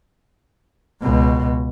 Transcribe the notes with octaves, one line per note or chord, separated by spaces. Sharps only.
C#2 B2